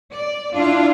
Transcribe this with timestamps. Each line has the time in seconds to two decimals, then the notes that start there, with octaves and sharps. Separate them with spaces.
0.12 D5
0.53 D4 E4 F4